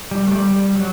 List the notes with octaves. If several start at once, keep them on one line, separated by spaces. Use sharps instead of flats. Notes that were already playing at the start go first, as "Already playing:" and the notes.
G3
A3
G3
G3
F#3